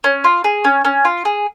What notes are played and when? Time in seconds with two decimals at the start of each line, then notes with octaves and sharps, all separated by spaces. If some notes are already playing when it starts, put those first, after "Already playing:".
0.04 C#4
0.24 F4
0.44 G#4
0.64 C#4
0.85 C#4
1.05 F4
1.25 G#4